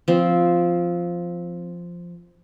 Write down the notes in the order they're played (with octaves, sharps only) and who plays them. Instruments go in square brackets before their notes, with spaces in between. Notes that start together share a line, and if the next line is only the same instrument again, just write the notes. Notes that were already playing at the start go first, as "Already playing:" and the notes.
[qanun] F3 C4